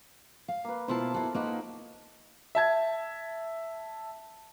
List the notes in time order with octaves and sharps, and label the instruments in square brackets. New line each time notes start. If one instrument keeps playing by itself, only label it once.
[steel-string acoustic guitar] F5
[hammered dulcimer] A#3 B4
[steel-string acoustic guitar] B2 E4 A5 [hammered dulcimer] F4 C5
[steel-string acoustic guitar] E4 F#4 [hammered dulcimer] A4 F5
[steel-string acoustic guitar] A#3 F#4 B4 [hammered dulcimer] D#4 D6
[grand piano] E5 A5 G#6